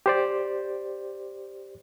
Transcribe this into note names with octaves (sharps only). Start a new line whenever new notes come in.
G4 C5 D5